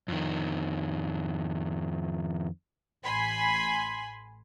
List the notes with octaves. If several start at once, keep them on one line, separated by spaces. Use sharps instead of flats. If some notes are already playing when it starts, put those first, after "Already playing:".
F2 D#3
A1 G#5 B5 C6